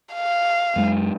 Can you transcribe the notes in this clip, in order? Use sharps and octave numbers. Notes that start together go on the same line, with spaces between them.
F5
F#2 G#3